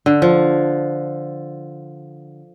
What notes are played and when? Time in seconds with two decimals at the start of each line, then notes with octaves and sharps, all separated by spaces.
0.06 D3
0.22 F3